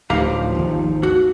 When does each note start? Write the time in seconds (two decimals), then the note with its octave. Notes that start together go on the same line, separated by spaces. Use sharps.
0.10 D1 D2 F3 D#4 G4 F5 A#5
0.55 G#1 D#2
1.03 F#4